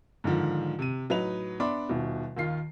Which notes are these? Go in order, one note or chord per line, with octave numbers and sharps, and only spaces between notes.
G#2 D3 D#3 F3
C3 D#7
A2 F#3 D#4 B4 F7
B3 D4 E5 B5 C6 D6
D#1 B2
D#2 D#3 F4 C7